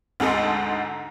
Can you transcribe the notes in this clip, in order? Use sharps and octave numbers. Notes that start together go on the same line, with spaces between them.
D2 G#2 G#3 A4 D#5